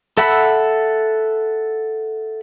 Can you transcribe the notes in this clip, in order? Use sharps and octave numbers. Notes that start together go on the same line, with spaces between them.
A4 E5 F#5 B5